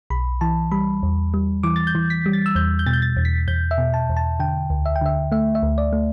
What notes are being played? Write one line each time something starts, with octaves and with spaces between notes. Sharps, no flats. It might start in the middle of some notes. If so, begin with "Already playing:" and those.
B1 B5
E3 A5
G3 B5
E2
G3
E3 D6
A6
G6
E3
B6
G3
A6
E6
E2 G6
G6
B2 A6
G6
A6
E2
B6
E2 G6
E5
B2
A5
E2
A5
D3 G5
D2
E5
G5
D3 E5
A3 E5
E5
D2
D5
A3